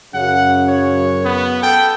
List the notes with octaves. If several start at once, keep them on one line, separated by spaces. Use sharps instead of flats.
F#2 C#3 F#5
C#5
B3
A4 G5